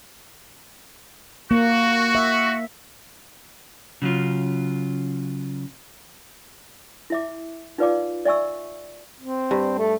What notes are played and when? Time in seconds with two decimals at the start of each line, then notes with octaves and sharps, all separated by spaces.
1.51 A#3 F#4
2.15 E5
4.02 C#3 F#3 C#4 F4
7.10 E4 E5 D6
7.78 D#4 F4 B4 D5 F5 D6
8.25 D5 E5 G#5 C#6 E6
9.20 C4
9.51 G2
9.78 A3